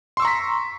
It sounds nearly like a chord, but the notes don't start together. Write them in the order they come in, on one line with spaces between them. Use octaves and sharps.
C6 E6 C#6 A#5 B6